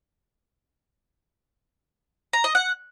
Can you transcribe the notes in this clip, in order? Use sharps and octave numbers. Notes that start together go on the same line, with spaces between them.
A#5
D#5
F#5